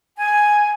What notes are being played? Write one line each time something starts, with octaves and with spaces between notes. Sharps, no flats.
G#5